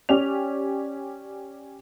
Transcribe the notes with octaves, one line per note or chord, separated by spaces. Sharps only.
C#4 G4 D5 F7